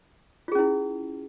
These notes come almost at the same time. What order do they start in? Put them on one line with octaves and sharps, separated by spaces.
F4 G#4 C#4 E4